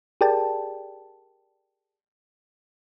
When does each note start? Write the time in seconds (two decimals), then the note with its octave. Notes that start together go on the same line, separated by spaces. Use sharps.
0.21 G4 G#4 A#4 D5 G5 A5